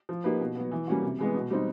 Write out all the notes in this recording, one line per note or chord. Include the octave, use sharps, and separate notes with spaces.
F3
A#3 D#4 G4 B4
B2
F#3 B3
E3
G3 A#3 C#4 F#4
C3
E3 G#3 B3
B2
G3 C4 D#4